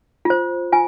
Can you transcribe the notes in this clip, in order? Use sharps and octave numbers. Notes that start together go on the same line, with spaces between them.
F4 C5
F4 G#5